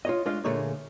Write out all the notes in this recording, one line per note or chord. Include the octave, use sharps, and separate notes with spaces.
F4 C#5 D#5
G#3 A3 D4 F4 D#5 F5
A#2 D3 A3 A#3 G#4 C#5